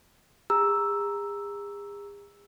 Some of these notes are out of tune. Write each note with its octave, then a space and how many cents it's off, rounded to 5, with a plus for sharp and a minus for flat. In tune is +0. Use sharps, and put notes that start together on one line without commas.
G#4 -40 A#5 +0 E6 +0